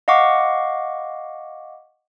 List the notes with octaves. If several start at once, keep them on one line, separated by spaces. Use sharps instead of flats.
D#5 F5 F#5 C#6 D6